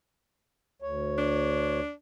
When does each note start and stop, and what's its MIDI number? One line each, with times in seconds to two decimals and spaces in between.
0.82 1.80 38
0.82 1.80 73
1.18 1.91 62